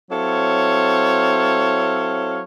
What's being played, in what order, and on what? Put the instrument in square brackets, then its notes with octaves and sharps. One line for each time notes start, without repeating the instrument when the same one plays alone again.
[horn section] F#3 C4 E4 A4 C#5 F5